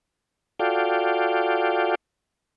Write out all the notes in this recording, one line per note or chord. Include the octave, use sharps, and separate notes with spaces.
F4 F#4 A4 D5 F5 G5